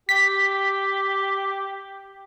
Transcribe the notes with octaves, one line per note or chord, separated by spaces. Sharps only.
G4 B6